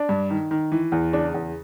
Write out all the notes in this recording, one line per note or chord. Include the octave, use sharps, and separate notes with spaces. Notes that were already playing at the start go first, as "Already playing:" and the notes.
Already playing: D4
G2
D#3
D#3
E3
E2
C#3 D4
E2